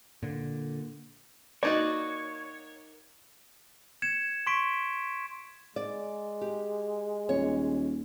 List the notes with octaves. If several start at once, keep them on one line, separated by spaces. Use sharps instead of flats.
A#2 D3
A#3 D#4 F#4 C#5 D5
G#6 C#7 E7
C6 C#6 B6 D7
G#3 D5
G4
D#1 C#5